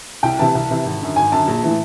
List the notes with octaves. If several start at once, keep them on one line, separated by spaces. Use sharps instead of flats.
C2 G5
C3 E3 A5
C2
C3 E3
G#1
F#2 D3
G#1 G#5
F#2 D3 A5
A#1
A2 E3